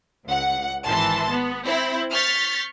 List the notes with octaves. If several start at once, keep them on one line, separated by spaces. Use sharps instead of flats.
C#2 F#5
G#1 E3 A5 C6
B3
C4 E4
C#6 F6 G6 A6 B6